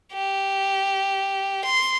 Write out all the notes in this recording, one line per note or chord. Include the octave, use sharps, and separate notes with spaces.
G4
C6